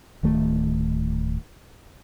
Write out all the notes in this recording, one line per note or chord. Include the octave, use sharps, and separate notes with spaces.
D1 D#3 A3